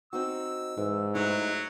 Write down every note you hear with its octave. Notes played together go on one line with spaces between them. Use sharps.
C4 D#4 F#4 E6
G#2 E3
F#3 A3 D#4 E4